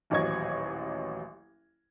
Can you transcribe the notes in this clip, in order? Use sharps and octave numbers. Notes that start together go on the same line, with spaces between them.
D#1 A1 F#3 D#5 C#6 G#6